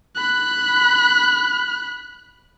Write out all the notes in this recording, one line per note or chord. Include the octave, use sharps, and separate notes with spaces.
B5 F#6